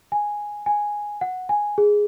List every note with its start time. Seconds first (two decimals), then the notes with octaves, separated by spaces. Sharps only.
0.12 G#5
0.66 G#5
1.21 F#5
1.49 G#5
1.78 G#4